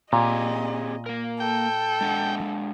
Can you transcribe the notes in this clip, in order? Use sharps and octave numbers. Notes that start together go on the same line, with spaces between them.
A#2 C4 G4 G#4 D#5
A#3 A#4
A4 G5
G#3 D4 F#5